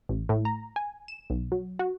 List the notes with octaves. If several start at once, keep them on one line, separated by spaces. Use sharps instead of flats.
A1
A2
A#5
G#5
E7
B1
F#3
F#4